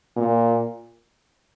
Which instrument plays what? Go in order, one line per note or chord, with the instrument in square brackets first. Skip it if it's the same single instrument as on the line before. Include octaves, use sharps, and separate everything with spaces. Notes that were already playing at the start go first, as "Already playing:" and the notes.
[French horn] A#2